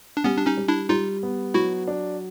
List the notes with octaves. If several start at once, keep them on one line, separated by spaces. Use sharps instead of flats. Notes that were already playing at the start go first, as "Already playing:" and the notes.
D4
G3 B3 C#4
D4
C#4 D#4
G3
D4 E4
G3 D#4 F4
B3
F#3 E4 F#4
D4